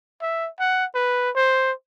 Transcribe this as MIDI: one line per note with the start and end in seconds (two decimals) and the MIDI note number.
0.22 0.49 76
0.59 0.85 78
0.95 1.30 71
1.35 1.72 72